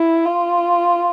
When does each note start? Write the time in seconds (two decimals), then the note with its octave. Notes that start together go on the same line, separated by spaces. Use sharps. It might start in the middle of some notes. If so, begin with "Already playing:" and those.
Already playing: E4
0.26 F4